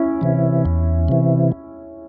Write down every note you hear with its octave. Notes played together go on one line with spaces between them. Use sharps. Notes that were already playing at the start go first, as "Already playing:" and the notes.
Already playing: C#4 E4
C3 E3
E2
C3 E3